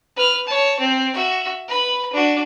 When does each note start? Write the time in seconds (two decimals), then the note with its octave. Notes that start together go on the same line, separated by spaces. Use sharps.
0.16 B4 F6
0.47 C#5 A5
0.79 C4
1.13 F#4 E5
1.68 B4 B5
2.13 D4 F#4